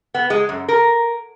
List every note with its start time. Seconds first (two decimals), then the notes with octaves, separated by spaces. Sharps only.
0.14 B3
0.30 G#3
0.49 F#2
0.68 A#4